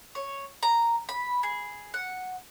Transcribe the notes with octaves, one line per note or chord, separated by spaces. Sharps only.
C#5
A#5
B5
G#4
F#5